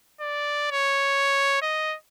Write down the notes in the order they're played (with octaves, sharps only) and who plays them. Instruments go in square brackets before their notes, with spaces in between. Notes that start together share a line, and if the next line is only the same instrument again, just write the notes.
[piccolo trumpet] D5
C#5
D#5